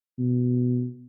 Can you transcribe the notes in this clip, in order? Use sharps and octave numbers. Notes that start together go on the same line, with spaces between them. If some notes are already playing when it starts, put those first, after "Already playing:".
B2